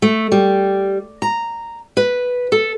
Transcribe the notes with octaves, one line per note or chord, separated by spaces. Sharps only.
A3
G3
A#5
B4
A4